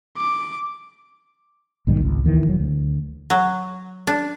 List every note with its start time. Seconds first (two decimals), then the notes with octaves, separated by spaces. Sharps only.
0.17 D6
1.87 B1 G#2 D#3 G3
2.00 G#1 C#2
2.24 D#2 D#3 E3
2.47 E1 F#3
2.60 D2
3.30 F#3
4.07 D4